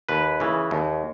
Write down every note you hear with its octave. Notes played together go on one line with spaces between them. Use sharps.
D#2 B4
C#3 E3
D#2